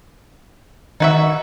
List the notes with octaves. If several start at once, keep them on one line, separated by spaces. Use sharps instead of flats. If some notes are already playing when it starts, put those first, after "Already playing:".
D#3 D#4 F#4 E5